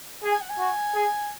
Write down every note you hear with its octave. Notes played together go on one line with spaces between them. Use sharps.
G#4
G#5
F#5
G#5
F#4
G#4